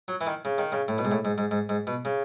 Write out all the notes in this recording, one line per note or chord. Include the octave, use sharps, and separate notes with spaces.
F#3
E3
D#3
C#3
D#3
C#3
A2
B2
G#2
A2
G#2
G#2
G#2
G#2
B2
C#3